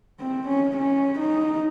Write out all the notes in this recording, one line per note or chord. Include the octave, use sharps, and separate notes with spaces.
C4
C#4
C#4
D#4